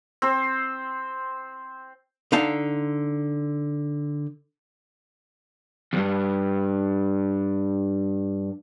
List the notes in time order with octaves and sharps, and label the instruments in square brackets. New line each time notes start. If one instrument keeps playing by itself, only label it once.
[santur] C4 C5
[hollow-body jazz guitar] D3 D#4 F5 A5
[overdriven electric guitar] E2 G2